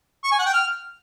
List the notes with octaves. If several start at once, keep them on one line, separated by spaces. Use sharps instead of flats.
C#6
G#5
F#5
G5
F6